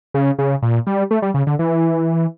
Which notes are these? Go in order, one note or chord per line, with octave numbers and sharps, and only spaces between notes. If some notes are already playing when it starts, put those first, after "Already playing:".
C#3
C#3
A#2
G3
A3
G3
C#3
D3
E3